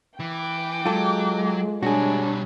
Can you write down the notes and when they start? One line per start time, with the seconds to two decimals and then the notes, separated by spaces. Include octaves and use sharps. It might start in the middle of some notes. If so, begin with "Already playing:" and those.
0.20 E3 G5 D6
0.86 F#3 G#3 F4 A4
1.83 B2 G3 D4 F#4 G#4 C#5